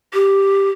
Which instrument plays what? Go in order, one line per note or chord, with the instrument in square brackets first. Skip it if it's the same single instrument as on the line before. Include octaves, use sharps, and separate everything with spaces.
[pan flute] G4